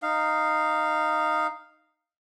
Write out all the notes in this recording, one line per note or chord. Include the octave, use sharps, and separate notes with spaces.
D#4 F5